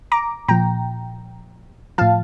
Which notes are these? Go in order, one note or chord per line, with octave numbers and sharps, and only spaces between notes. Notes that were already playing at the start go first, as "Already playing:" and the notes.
A#5 D6
A#2 F3 G5 A#5
A2 F3 F5 A5